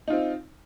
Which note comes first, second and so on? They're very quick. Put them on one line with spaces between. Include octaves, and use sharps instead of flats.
D#4 F4 C4